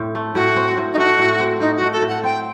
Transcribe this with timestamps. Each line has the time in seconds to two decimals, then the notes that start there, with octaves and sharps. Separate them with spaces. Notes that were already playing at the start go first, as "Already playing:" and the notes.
Already playing: A2 C4
0.15 A3
0.35 A2 F#4
0.56 C4
0.78 A2
0.93 D#4
0.97 A3 F#4
1.19 A2
1.40 C4
1.60 A2 D#4
1.76 F#4
1.81 A3
1.92 A4
2.02 A2
2.08 F#5
2.23 C4 G5